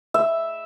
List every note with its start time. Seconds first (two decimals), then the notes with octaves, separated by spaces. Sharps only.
0.14 E5